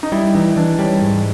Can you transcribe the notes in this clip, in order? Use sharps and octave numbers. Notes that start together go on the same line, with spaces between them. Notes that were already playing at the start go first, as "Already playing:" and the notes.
D#4
G3 E4
E3 D#4
E3 D4
G3 C#4
G#2